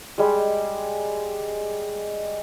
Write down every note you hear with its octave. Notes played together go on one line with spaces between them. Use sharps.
G3 G#3